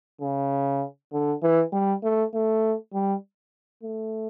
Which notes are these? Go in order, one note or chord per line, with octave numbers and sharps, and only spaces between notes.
C#3
D3
E3
G3
A3
A3
G3
A3